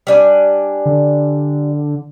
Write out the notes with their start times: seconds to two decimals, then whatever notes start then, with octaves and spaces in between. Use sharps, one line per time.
0.07 G3 D4 G#5
0.86 D3